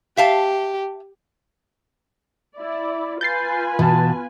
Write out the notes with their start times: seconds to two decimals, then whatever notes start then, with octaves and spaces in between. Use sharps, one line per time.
0.17 G4 E5 F5 A5
2.56 E4 D5
3.21 F4 B4 G#5 G6 A6 C7
3.79 B2 E3 A5